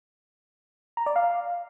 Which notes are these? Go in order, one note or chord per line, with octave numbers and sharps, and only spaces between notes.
A#5
D5
F5